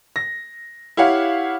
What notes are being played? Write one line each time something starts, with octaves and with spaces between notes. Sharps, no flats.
A#6
E4 G4 C#5 F5 F#5